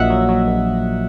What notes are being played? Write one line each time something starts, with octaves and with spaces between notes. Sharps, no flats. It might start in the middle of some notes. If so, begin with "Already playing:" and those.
Already playing: A#1 A#2 F#3 D#5 E5 F#5
F#3
F#3
A#1